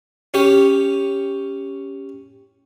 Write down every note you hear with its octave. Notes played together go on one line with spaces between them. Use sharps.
C#4 G4